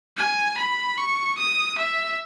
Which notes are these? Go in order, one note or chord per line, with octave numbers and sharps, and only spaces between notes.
G#5
B5
C#6
D#6
E5